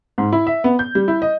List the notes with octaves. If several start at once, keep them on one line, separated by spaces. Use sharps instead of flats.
G#2
E4
E5
B3
G6
G3
E4
D#5